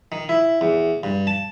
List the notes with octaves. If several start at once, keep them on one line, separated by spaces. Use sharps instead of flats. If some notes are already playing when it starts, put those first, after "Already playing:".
D#3
E4
E2
G2
A5